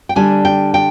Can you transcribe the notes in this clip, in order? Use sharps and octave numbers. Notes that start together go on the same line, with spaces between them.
G5
D3 G3 D4 G#5
G5
G5